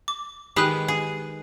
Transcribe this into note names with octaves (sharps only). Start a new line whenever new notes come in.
D6
D#3 G#3 G4 G#4 B4 G5 D#6 F#6
G#4